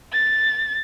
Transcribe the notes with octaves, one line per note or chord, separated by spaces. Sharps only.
A6